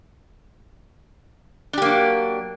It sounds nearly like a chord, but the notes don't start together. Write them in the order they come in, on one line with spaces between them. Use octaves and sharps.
D4 G4 A#3 F#3